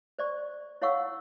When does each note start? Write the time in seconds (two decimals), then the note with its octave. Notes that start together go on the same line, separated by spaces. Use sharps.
0.19 C5 D5 C#6
0.82 E4 C#5 F5 F#5 C#6 E6